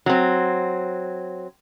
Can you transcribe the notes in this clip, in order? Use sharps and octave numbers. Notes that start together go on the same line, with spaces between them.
F#3 C4